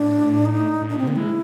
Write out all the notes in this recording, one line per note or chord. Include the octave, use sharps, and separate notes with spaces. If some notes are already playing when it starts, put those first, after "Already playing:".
Already playing: A2 D4
D#4
A2
A#2 D4
C3 C4
D3 A#3
G#3 E4